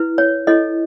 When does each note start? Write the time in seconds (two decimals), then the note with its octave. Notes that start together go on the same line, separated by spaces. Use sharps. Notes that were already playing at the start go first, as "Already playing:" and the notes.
Already playing: E4 B4
0.18 C#5
0.47 E4 A4 C#5 D#5